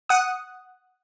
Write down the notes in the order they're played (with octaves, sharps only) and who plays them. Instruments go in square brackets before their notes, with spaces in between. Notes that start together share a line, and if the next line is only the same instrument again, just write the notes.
[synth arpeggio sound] F#5 D#6